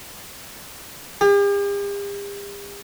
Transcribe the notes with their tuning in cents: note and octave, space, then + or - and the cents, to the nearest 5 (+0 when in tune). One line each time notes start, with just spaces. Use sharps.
G4 +45